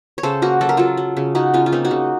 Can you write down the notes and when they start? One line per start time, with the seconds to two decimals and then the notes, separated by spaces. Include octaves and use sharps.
0.18 C#5
0.23 C#3 A4 C5
0.42 A#3 F#4 A#4
0.61 F#3 A4
0.69 A#4
0.77 F#3 F4 A4
0.97 F#3
1.17 C#3
1.35 C#3 D#4 F#4
1.54 C#3 C#4 F4
1.66 F4
1.72 A#3 C4 D#4
1.85 D#4 F#4
1.91 C#3